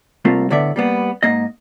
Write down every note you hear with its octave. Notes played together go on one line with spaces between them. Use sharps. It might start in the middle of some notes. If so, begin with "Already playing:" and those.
C2 A3 A#3 C4 F4
A2 D3 B3 D5 E5
G3 A#3 B3
G#2 A#3 D#5